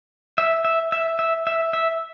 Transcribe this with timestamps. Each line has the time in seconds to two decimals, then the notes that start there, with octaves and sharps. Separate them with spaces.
0.38 E5
0.65 E5
0.92 E5
1.19 E5
1.47 E5
1.73 E5